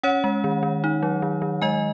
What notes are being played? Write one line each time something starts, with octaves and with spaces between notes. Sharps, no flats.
C#4 C#5 F#5
G#3
D#3
D#3
D#4
F#3
D#3
D#3
G#3 D#5 G#5